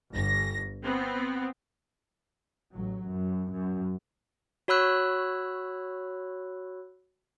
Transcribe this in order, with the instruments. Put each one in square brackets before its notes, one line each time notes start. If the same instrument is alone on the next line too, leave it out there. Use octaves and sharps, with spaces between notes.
[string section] G1 A#6
B3 C4
[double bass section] A1 F#3
F#2
F#2
[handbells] F#4 C#5 B5 E6 F#6